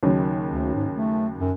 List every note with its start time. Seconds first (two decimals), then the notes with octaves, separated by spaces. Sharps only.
0.03 D#2 C#3 F#3
0.51 D2
0.75 G#2
0.93 A3
1.39 F#2